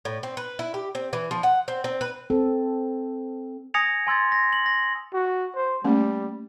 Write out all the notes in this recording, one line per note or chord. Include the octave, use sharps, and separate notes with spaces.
A2
C4
B4
E4
G4
C4
E3
F3
F#5
C4
C4
B4
C4 A4
G#5 D#6 G#6 A#6 C#7 F7
G#5 C6 E6 G#6 A6
A#6
F#7
A#6
F#4
C5
G3 A3 A#3 C#4